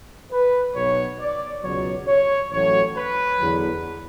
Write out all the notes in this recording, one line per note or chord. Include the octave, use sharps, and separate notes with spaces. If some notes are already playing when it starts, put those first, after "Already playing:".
B4
B1 B2 F#3 C#5
D5
C#2 B2 F#3 C#5
C#5
A1 A2 F#3 C#5
B4
E2 D3 F#3